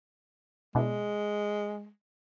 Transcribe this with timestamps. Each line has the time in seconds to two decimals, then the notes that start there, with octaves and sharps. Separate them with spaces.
0.75 B2 G#3 D4 E4